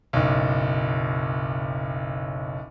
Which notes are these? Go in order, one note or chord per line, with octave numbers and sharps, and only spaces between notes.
F#1 B1